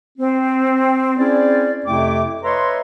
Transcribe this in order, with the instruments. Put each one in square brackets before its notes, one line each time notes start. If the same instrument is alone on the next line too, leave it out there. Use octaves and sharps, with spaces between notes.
[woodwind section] C4
C4 C#4 E4 G#4 C5 D5
F2 C3 A3 E4 G5 D6
B4 C#5 D#5 E5 A#5 C6